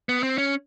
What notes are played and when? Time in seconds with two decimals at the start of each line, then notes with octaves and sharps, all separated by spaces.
0.09 B3
0.23 C4
0.38 C#4